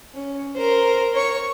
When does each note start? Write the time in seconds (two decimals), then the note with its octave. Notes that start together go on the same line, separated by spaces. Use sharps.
0.14 C#4
0.55 A#4 C5
1.13 C#5 C#6